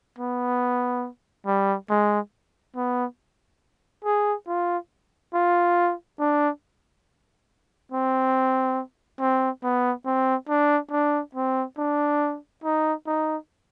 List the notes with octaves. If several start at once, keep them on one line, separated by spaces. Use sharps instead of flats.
B3
G3
G#3
B3
G#4
F4
F4
D4
C4
C4
B3
C4
D4
D4
C4
D4
D#4
D#4